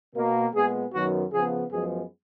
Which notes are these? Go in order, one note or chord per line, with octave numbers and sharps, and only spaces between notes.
B2 A#3
A#2 G#3 B3 G#4
F#2 D#3 F#3 B3 F#4
C#3 F3 B3 G#4
F#2 F3 G#3 B3 G#4